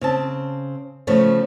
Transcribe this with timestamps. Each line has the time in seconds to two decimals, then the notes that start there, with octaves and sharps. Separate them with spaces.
0.01 C#3 C4 A5
1.07 C#3 F3 A3 B3